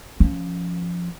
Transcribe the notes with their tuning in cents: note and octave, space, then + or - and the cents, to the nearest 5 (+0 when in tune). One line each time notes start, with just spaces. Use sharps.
F3 +0 C#4 +0